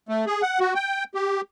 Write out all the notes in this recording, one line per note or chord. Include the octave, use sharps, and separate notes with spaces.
A3
G#4
F#5
F#4
G5
G4